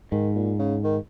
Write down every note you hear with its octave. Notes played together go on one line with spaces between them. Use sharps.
G#2 D#3
A#2
C#3
D#3